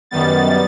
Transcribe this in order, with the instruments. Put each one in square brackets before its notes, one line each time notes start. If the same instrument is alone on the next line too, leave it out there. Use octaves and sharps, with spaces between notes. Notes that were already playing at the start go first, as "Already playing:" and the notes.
[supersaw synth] F#2 D#3 G3 B3 A6